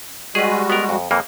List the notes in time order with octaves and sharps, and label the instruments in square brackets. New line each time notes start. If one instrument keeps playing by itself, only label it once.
[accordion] G3 G#3 F#4 [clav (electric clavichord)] G#4 B4
[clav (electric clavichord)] B3 A#4
F2
F2 E3 A#3